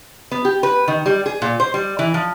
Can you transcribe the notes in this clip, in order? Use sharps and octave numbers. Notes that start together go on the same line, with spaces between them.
B3
G4
B4
D#3
G3
G#4
A#2
C5
G3
E3
F3